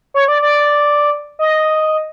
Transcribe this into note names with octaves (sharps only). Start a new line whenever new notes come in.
C#5
D5
D5
D#5